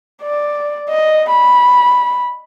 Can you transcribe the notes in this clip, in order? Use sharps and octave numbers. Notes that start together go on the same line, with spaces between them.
D5
D#5
B5